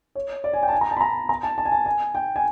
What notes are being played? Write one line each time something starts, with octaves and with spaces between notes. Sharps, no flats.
C#5
D5
G#5
G5
A5
G#5
A#5
A5
B5
A#5
A#5
A5
A5
G#5
A5
G#5
G5
G#5